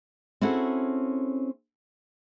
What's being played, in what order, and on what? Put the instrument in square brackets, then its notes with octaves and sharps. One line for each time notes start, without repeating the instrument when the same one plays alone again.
[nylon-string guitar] C4 C#4 E4 F#4 G#4 A4